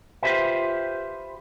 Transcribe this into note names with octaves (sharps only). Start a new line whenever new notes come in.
F4 G4 G#4 B4 C5 E5